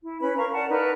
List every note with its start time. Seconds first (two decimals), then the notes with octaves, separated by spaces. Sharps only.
0.03 E4
0.21 C#4 B4 B5
0.38 A#4 F5 A#5 C#6
0.53 A#4 D5 F#5 A5
0.69 D#4 A#4 B4 D5